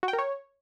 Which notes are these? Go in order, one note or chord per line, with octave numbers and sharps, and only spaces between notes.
F#4
G5
A#4
C#5